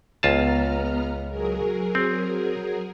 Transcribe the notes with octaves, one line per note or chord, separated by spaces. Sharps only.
C#2 B3 F4 A5 A#5 F6
F#3 G#4 A#4
C4